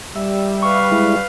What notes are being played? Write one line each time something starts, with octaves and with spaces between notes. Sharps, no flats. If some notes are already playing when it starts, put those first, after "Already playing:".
G3 E5
B4 F5 C#6
G#3 E4